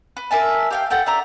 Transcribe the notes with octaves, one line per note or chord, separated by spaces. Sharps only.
B4
A#4 E5 G#5 A5
G4 F5 G5
A4 F#5 G5 A5
D4 E5 A#5